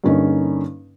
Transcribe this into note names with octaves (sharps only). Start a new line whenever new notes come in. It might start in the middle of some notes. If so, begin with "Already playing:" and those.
G2 D3 A#3 C#4 D#4